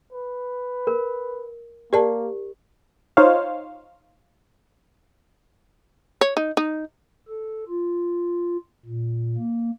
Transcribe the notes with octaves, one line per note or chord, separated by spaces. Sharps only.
B4
A#4
A#3 G4 A#4 D5 A5
D#4 F4 C5 C#5 F5
C#5
D#4
D#4
A4
F4
A#2
A#3